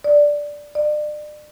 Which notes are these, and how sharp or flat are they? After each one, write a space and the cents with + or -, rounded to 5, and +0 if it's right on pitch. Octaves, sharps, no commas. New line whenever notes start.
D5 -5
D5 +35